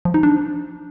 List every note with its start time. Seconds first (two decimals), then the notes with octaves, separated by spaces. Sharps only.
0.05 F3
0.14 D#4
0.23 D4